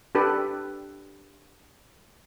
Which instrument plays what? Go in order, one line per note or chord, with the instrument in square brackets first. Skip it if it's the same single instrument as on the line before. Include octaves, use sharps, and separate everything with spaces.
[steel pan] D4 G4 A4 B4